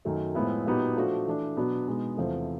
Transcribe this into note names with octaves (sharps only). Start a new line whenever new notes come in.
F#2 D#3 F#3 A3
A2 F3 G#3 B3 E4
A#2 F#3 B3 D#4 G4
F3 A3 D4 F#4
E3 A3 D4
B2 F#3 B3 D4
B2 G#3 B3 D#4
E2 C3 F3 A3